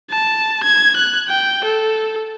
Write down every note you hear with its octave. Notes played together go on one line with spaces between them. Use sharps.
A5
G#6
F#6
G5
A4